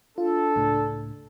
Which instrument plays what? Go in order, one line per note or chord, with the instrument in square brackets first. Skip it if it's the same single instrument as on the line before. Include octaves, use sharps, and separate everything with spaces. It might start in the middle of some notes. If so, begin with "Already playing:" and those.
[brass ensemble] D4 A4 [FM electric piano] F4
[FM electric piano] C#2 A2